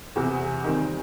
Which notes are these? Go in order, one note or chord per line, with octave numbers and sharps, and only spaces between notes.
E2 C3 E3
D#3 G3 C4